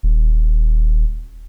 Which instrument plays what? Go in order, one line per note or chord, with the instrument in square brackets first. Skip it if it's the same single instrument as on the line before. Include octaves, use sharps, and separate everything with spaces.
[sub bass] D#1